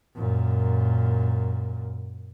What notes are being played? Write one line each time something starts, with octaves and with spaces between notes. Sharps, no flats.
F#2 A#2